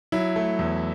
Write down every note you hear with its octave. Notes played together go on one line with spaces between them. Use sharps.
F#3 E4
A3
E2